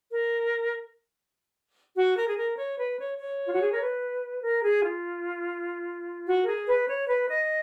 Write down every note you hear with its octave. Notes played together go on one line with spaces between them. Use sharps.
A#4
F#4
A#4
G#4
A#4
C#5
B4
C#5
C#5
F4
F#4
G#4
A#4
B4
A#4
G#4
F4
F#4
A#4
G#4
B4
C#5
B4
D#5